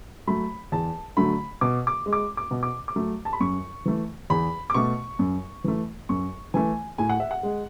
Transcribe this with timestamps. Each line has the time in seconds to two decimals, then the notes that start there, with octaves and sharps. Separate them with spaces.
0.27 F#3 A3 B5
0.72 E2 A5
1.17 D3 F#3 A3 B5
1.61 B2 D6
1.87 D6
2.06 G#3
2.13 D6
2.37 D6
2.51 B2
2.63 D6
2.88 D6
2.96 F#3 A3
3.25 A5
3.33 B5
3.40 F#2 C#6
3.85 E3 A3
4.30 E2 B5
4.70 D6
4.74 B2 A3 C#6
5.19 F#2
5.64 E3 A3
6.09 F#2 C#6
6.54 E3 A3 G#5
6.98 A2 G#5
7.09 F#5
7.20 E5
7.31 F#5
7.43 G#3